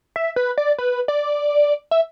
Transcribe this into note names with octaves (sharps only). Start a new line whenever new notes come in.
E5
B4
D5
B4
D5
E5